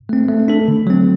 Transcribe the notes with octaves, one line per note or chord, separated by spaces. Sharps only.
A3 C4
A3
D4 A4
D3
F#3 C4